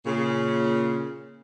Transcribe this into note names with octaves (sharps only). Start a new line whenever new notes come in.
A#2 C#3